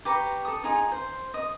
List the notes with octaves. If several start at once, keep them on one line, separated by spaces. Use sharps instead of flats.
G4 B4 A#5 C#6
A4 D#6
D#4 F4 G#4
C5
D#5